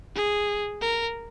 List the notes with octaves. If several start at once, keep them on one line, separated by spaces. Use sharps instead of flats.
G#4
A#4